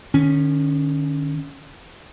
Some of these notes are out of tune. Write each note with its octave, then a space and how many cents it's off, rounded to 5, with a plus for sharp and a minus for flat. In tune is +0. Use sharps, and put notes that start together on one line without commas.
D#3 -45 C#4 +0